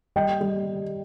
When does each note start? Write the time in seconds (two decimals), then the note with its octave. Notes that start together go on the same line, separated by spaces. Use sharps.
0.16 G3 D#5 G5
0.41 G3